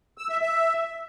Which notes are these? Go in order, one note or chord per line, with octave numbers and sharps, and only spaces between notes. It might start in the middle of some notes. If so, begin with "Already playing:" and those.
E6
E5
E5